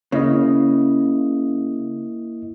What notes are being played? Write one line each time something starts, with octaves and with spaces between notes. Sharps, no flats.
C#3 A#3 E4 D#5